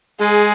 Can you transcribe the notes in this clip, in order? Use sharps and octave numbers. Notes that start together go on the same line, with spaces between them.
G#3 G#4